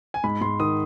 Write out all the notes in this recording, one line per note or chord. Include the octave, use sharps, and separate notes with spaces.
G#5
G#2 B5
G#2 C6
D#3 D#6